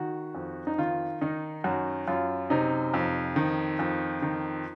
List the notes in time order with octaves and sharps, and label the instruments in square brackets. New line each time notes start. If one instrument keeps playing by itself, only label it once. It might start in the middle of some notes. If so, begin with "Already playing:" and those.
Already playing: [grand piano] D#3 F#4
F2
D#4
D#3 F4
D#3 D#4
F#2 F#4
F#2 F4
C3 D#4
F2
D#3
F2
D#3